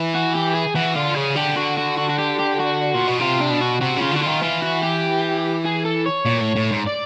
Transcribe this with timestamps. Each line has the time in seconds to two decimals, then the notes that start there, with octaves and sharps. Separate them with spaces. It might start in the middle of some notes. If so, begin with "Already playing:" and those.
Already playing: E3
0.15 F#4
0.35 G4
0.55 G#4
0.75 E3 F#4
0.96 D3 F4
1.16 C#3 G#4
1.36 D3 G4
1.57 F#4
1.78 F#4
1.98 F#4
2.09 F#4
2.19 G4
2.39 G4
2.59 F#4
2.95 A#2
3.08 B2
3.20 C3 F4
3.40 D4
3.50 B2
3.61 F#4
3.81 C3 F#4
3.97 C#3 F4
4.12 D3 F#4
4.22 D#3 F4
4.42 E3 F4
4.62 F#4
4.83 G4
5.65 G#4
5.85 A4
6.06 C#5
6.26 A#2
6.41 A2
6.56 A2
6.71 G#2
6.86 D5